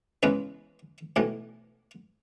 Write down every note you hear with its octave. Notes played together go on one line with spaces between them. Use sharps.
E2 C#3 G#3 C#4 B4
B1 A2 E3